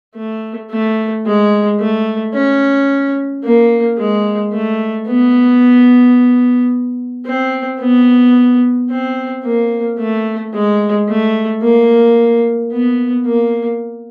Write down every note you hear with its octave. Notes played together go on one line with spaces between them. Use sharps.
A3
A3
G#3
A3
C#4
A#3
G#3
A3
B3
C4
B3
C4
A#3
A3
G#3
A3
A#3
B3
A#3